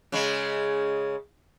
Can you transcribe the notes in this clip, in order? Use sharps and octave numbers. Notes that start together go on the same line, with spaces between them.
C#3 G#3